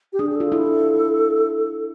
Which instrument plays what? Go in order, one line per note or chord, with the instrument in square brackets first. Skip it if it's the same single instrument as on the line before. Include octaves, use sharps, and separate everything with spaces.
[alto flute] G4
[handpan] D4 [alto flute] G#4
[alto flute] G#4
[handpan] F4 [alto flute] A4
[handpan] E4